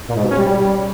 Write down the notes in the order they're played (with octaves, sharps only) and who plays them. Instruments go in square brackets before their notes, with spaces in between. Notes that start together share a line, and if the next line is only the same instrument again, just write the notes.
[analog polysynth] A#2
G#2
B2
C#4
G3